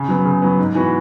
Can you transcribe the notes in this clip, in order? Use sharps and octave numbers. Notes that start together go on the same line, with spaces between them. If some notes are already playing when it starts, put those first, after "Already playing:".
Already playing: C#3
F#3 B3
C#3
F#3 B3
G#2
E3 B3 F#4